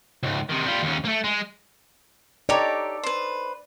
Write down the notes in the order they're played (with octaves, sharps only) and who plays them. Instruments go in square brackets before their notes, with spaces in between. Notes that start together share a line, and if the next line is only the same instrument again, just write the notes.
[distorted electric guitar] C#2 G#2
C3 D#3
G3 F4
D#2 C#4
A3 A#3
G#3
[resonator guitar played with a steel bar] D#4 A4 [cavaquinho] G4 C#5 A#5 [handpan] D5
[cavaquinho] B4 C5